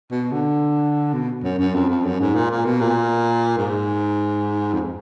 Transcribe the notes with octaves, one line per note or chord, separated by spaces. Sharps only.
B2
D3
B2
F#2
F#2
F2
F2
F#2
G#2
A#2
A#2
B2
A#2
G#2
F2